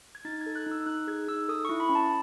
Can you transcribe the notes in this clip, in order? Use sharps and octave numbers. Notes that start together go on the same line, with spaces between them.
G#6
D#4 A6
G#6
A4
F#6
D#4 E6
D#4 F#6
G#4 G#6
D#4 E6
A4 D#6
E4 C#6
B5
C#4
A5